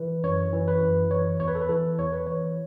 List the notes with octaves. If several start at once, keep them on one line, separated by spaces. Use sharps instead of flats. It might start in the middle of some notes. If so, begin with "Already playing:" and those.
Already playing: E3 B4
F#2 C#5
E3
B4
F#2
E3 C#5
E2 C#5
B4
A4
B4
E3 A4
E2 C#5
B4
E3 C#5